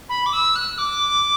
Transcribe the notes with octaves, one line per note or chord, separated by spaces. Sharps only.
B5
D6
E6
F#6
D6